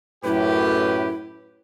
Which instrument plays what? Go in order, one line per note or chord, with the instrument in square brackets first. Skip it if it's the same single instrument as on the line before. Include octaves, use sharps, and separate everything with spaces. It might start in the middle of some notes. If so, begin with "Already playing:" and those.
[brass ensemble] F#2 A2 G4 [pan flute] E4 [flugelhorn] B4